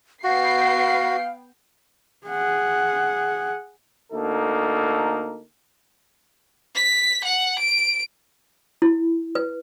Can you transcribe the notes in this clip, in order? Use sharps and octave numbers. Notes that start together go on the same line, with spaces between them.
B3 F#4 F5 G5 C7
G#4 F#5
D2 A#3 D#4 A4
B6
F#5
D7
E4
B4